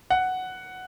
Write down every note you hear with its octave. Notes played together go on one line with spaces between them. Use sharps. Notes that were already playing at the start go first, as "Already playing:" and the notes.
F#5